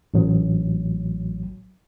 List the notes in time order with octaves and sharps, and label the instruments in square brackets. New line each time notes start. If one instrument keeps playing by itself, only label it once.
[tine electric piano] A1 F#3